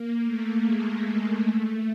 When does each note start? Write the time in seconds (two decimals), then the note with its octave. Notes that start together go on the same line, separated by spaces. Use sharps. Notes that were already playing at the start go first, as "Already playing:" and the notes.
Already playing: A#3
0.24 A3
0.61 G#3
1.37 A3